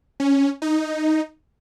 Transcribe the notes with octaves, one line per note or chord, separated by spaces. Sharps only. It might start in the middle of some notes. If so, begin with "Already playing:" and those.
C#4
D#4